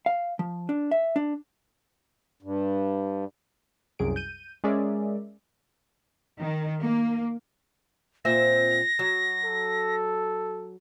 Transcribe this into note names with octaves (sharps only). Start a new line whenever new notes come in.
F5
F3
D4
E5
D4
G2
C2 F#2 G#4 D7
G6 D#7
G#3 C#4 G#4 A#4 D5 E5
D#3
A#3
A#2 C4 E5 A#6
F#3
A4